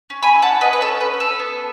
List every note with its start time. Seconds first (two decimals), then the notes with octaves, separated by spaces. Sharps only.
0.10 C#4
0.23 G#5 B5
0.36 E4
0.42 F#5 A5
0.61 C#4 B4 D#5
0.73 B4
0.81 A4 C#5
0.88 C#4
1.01 B4
1.14 C#4
1.20 A4
1.40 B3